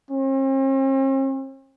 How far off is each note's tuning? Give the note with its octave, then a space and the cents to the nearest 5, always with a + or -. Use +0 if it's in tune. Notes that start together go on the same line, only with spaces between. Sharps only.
C4 +45